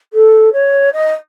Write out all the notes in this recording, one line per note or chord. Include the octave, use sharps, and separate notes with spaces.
A4
C#5
D#5